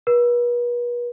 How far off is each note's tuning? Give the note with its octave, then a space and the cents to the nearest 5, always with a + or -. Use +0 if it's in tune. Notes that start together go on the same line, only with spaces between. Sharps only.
B4 -40